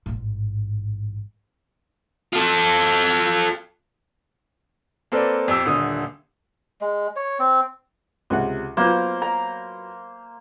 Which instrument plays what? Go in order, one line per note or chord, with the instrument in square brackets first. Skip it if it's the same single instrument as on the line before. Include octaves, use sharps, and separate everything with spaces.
[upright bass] A1 G#2
[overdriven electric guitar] F4 A4
[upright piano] A#3 C4 A4 B4 D5
F2 G4 G5 E6
D#1 D3 D#6
[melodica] G#3
C#5
C4
[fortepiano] C#2 C3 F#5
[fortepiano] F#3 B3 F4 [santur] A#3 C5
[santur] A#5